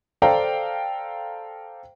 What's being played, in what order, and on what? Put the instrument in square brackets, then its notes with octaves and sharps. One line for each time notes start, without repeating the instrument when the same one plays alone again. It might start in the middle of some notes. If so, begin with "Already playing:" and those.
[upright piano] A4 C5 D5 F5 G5 A#5